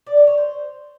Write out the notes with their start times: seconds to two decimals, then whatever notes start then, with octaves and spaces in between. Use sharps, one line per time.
0.07 D5
0.17 D5
0.27 C#5
0.37 C5